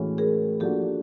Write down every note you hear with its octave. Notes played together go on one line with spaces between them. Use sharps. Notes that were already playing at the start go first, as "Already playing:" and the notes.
Already playing: A2 E3 G#3 C#4 F#4
G#4 A#4
F3 A#3 D4 F#4 G4 A4